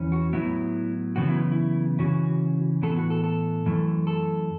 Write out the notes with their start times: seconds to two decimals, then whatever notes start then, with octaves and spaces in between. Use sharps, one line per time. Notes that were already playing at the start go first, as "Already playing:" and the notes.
Already playing: E2 E3 C#4
0.12 F#4
0.33 A2 F#3 B3 E4
1.16 F#2 C#3 E3 B3 F#4
1.28 E4
1.52 E4
1.99 C#3 E3 C#4 F#4
2.82 A2 E3 B3 A4
2.96 F#4
3.10 A4
3.24 A4
3.66 F#2 E3 A3
4.07 A4